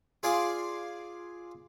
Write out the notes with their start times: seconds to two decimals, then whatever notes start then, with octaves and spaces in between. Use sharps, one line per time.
0.23 F4 G#4 D5 G#5 C6 D6